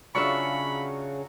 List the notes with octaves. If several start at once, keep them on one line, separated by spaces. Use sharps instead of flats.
C#3 F#3 D4 F4 E5 B5 C#6